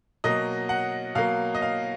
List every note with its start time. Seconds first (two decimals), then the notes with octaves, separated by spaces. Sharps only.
0.24 B2 F#3 A#3 D#5
0.69 F#5
1.15 B2 F#3 A#3 F5
1.55 D#5
1.62 F5